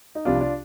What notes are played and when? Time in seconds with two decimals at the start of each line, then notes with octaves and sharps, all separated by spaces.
0.15 D#4
0.25 C2 C3 F3 D4 F4
0.40 D4 F4